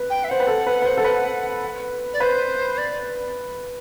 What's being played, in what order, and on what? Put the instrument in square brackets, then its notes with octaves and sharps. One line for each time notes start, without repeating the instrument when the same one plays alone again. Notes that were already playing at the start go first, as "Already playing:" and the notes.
Already playing: [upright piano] B4
[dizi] G5
E5
[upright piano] C5 [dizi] F#5
[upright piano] B4
A4
B4
B4
C5
A4
B4
[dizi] D5
[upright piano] B4 [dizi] C5
[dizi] D5